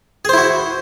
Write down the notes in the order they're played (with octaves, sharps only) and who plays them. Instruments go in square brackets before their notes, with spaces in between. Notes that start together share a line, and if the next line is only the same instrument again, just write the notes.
[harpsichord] G#4
C5
E4
F#4